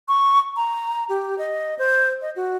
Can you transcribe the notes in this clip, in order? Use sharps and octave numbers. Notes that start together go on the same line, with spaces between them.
C#6
A#5
G4
D#5
C5
D#5
F#4